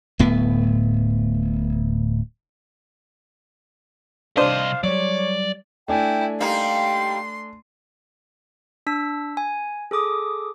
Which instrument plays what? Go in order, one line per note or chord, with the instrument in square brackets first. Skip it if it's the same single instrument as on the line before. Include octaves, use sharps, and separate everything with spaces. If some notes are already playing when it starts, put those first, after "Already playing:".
[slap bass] D1 A2 B3
[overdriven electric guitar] C2 D#5 [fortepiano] D4 C5 [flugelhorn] F5
[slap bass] F#3 G3 [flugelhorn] C#5 [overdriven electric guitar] D5
[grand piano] A3 D4 G#5 [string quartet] E4 [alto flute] G5
[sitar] G3 A#3 D#4 [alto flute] G5 [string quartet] C6
[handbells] D4 E6 B6
G#5
G#4 A4 D6 D#6